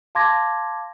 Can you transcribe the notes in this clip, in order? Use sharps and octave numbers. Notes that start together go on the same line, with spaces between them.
F5 A5 C6 D6 G#6 A#6